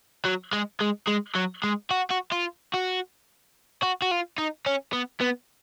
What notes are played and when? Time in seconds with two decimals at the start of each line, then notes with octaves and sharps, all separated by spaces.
0.25 F#3
0.53 G#3
0.81 G#3
1.08 G#3
1.35 F#3
1.64 G#3
1.91 F#4
2.11 F#4
2.32 F4
2.74 F#4
3.83 F#4
4.02 F#4
4.11 F4
4.38 D#4
4.66 C#4
4.93 B3
5.21 B3